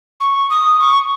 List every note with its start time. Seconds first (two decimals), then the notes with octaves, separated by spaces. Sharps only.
0.21 C#6
0.50 D#6
0.80 C#6